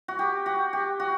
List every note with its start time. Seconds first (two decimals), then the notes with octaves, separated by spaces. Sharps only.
0.08 F#4
0.19 G4
0.46 F#4
0.73 G4
1.00 F#4